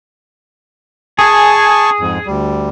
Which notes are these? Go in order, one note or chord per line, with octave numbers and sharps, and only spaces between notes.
G#4 G#5 A5 C#6
F2 G#2
D2 G3